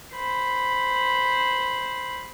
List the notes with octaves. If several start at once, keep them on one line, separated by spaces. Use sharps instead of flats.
C5 B5